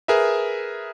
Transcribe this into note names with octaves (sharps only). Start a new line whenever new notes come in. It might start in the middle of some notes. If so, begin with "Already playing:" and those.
G#4 A#4 B4 E5